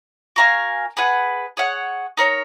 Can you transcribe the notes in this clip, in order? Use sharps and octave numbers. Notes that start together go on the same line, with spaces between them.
F#4 A#4 F5 G#5
G#4 B4 F#5
G#4 C#5 F#5
D#4 A#4 C#5